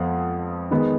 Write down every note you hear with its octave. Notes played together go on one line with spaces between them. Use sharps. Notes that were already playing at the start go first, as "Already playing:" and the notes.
Already playing: F2 F3 B3 F5 F#5
D#3 G#3 B3 D#4